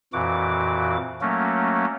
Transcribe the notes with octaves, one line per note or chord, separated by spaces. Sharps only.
F2 A#2 E3 F#4 D6
F#3 A3 A#3 C#4